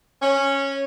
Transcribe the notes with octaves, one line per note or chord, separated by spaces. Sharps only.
C#4